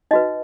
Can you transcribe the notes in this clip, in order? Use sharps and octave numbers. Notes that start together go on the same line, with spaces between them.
D#4 F#4 B4 D#5